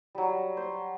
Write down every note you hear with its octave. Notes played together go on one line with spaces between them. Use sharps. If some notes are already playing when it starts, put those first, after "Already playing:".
F#3 G3
C5